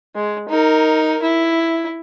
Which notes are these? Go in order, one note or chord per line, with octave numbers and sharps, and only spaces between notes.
G#3
D#4 A#4
E4